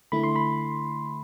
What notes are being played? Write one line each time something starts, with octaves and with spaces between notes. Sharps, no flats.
D3 A3 E4 B5
C6
B5